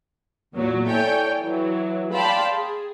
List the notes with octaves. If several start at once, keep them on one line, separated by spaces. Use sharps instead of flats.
E2 A#2 F#3
E4 A4 C#5 D5 G5 G#5
E3 F#3
D5 F5 G5 A5 B5 C6
G#4